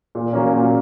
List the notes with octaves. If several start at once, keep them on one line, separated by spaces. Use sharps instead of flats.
A#2
F#3 A#3 C#4
A#2